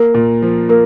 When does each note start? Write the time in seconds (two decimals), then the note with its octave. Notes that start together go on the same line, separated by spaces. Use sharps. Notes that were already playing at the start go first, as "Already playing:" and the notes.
Already playing: A#3 A#4
0.14 A#2
0.42 F3
0.69 A#3 A#4